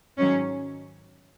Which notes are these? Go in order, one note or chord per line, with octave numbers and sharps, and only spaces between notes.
G#2 D#3 F#3 C#4